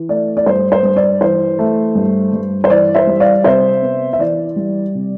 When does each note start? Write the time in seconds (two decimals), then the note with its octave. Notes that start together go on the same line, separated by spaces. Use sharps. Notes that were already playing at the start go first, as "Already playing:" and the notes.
Already playing: E3
0.09 A3 D5
0.37 D5
0.46 G2 C5
0.72 C5
0.83 G2
0.97 D5
1.21 E3 C5
1.59 A3
1.95 G2
2.33 G2
2.64 C5
2.70 E3 D5
2.94 C5 E5
3.07 G3
3.20 D5 F5
3.44 C3 C5 E5
3.82 B3
4.13 E5
4.19 E3 D5
4.56 G3
4.95 C3